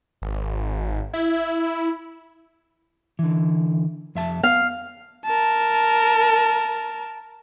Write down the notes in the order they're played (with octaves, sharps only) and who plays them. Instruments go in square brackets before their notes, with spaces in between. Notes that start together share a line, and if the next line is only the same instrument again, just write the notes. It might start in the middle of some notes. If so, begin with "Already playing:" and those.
[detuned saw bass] G#1
E4
[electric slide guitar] D3 E3
F2 E5 A5
[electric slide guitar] B3 [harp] F5
[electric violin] A#4 A5